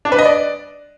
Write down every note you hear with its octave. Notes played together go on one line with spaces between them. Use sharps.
D4
B4
D#5
D5